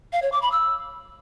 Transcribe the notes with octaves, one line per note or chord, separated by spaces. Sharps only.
F5
C#5
D6
B5
E6